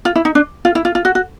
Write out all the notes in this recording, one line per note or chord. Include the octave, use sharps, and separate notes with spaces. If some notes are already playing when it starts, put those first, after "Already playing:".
F4
E4
D#4
D4
F4
E4
F4
F4
F#4
F#4